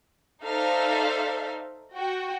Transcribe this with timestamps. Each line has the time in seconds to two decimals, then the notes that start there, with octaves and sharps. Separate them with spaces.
0.45 D#4 A4 C5 D5 E5 F5
1.95 F#4 G5